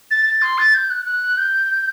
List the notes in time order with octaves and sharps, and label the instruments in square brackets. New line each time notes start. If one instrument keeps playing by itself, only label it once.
[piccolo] A6
A6
C6
A6
G6
F#6
F#6
G6